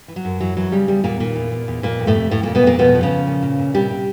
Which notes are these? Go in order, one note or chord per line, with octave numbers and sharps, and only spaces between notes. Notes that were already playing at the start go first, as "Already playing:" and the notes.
E3
F#3
F#2
E3 F#3
E3 F#3
C#3 G3
E2 G3
E2 A#2 A#3
A#2 D#3 A#3
E2
E2
E2
F2 A#2 A#3
F2
A2 A3
C3
F2 A2 A3
F2 A#2 A#3
B2 B3
F2 A#2 A#3
B2 F3 B3
F3
C#3 C#4
F3
A#2
A#2
A#2
C3 G3 G4
C3